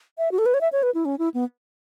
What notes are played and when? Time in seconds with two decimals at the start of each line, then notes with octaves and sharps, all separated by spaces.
0.18 E5
0.32 F#4
0.38 A4
0.46 B4
0.54 C#5
0.61 E5
0.72 C#5
0.83 B4
0.95 E4
1.05 C#4
1.19 E4
1.34 B3